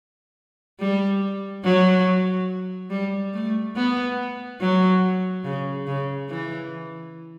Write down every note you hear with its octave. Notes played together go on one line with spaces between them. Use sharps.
G3
F#3
G3
A3
B3
F#3
C#3
C#3
E3